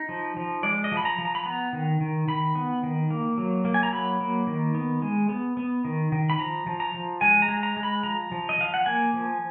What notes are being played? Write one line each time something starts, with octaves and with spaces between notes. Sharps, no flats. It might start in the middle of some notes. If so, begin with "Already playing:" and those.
Already playing: D#4
F3
F3
G#3 D5
D#5
F3
B5
A#5
F3
A#5
B5
B3 A#5
D#3
D#3
D#3 B5
B3
D#3
A#3
F#3
A#3
G#5
A#5
F#3 B5
A#3
D#3
B3
G#3
B3
B3
D#3
D#3
B5
F3 A#5
F3
A#5
F3
G#3 G#5
A#5
G#3
A#5
G#3
B5
F3 A#5
F3
D#5
F3 F5
F#5
A#3 G#5
F3